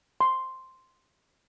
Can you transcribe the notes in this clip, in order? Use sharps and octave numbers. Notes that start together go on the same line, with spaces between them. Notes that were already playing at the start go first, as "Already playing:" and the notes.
C6